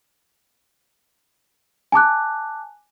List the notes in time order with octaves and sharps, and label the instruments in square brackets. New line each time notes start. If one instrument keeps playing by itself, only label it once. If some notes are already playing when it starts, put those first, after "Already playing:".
[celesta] G#5 A5 D6 F#6